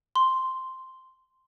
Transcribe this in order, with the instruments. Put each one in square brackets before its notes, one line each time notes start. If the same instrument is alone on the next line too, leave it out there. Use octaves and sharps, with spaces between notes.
[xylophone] C6